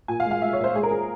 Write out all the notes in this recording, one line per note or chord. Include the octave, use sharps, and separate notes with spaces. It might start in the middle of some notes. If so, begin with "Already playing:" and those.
A#2 G#5
F5
G#3
F5
G#3 E5
C#5
A#2
C5
G#3 G#4
A#4
G#4